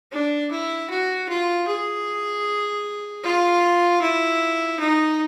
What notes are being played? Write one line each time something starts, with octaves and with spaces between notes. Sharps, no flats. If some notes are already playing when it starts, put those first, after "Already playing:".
D4
E4
F#4
F4
G#4
F4
E4
D#4